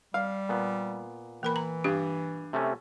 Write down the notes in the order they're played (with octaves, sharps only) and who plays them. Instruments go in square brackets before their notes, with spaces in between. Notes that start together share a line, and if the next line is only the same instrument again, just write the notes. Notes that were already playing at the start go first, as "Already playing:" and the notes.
[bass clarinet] G3 [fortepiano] F5
[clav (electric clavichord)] A#2 B3
[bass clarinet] E3 [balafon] A#3 A#4 B5
[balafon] A#5
[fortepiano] G2 [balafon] G4
[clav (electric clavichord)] C3 A3 C#4